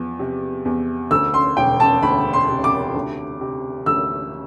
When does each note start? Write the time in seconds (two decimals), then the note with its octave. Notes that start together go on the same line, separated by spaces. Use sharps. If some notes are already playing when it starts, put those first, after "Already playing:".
Already playing: E2 F3
0.19 C3
0.65 E2
1.11 D2 E6
1.34 C6
1.57 E1 G5
1.80 A5
2.03 D2 B5
2.33 C6
2.49 C3
2.64 D6
2.95 D2
3.41 C3
3.86 D2 E6